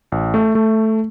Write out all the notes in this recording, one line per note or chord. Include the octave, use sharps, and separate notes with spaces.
A1
A3
A3